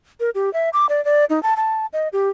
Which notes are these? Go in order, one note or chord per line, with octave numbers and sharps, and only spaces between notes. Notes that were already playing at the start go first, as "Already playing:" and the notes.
A#4
G4
E5
D6
D5
D5
D#4
A5
A5
D#5
G4